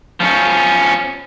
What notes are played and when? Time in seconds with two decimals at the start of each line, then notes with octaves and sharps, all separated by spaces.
0.20 F3 C#4